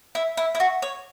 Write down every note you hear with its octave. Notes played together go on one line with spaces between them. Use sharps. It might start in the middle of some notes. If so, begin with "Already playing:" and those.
E4
E4
E4
F#4
C#5